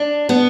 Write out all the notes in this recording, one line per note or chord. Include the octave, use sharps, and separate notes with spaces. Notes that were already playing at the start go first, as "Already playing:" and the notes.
Already playing: D4
B3